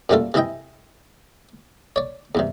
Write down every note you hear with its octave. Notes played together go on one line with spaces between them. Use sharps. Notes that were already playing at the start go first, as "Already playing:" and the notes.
F#2 A#2 G3 A3 F4 A4
C3 E3 E4 D#5 G5
C#5 D5
E2 G2 C3